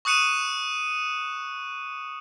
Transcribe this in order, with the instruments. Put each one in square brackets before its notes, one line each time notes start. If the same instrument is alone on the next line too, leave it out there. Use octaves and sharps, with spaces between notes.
[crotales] C#6 D#6 F#6 C#7 D#7 E7